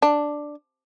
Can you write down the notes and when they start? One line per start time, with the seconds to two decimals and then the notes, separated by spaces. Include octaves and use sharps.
0.02 D4